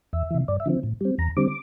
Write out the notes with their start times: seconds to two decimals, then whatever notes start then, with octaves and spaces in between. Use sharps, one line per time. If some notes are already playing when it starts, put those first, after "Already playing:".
0.13 E2 E5
0.31 C3 E3
0.48 G2 D5
0.60 E5
0.66 D3 F3 C4
0.83 A2
1.01 G3 C4
1.18 E2 A#5
1.37 D3 G3 C4 D6